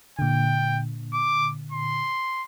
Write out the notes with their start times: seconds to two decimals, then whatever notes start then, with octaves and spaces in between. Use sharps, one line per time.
0.19 A#2 D3 G5
1.13 D6
1.72 C6